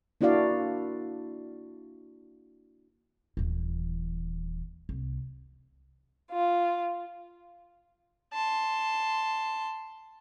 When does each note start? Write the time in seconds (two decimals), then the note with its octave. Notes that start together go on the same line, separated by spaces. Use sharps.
0.21 A#3 D4 E4 F#4 D5 F5
3.37 D#1 E3
4.89 C2
6.32 F4
8.33 A5 C6